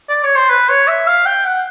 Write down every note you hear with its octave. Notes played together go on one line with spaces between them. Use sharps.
D5
C#5
C5
B4
C#5
E5
F5
G5
F#5